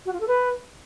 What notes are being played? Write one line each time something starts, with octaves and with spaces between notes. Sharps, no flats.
F#4
F4
A4
B4